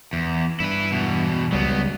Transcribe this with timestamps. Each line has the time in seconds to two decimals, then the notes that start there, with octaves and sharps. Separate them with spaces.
0.13 E2
0.60 G2 E4 B4
0.92 E2 B2
1.52 C#2 F#3 G3 B3